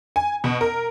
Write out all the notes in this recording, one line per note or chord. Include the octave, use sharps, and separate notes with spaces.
G#5
B2
A#4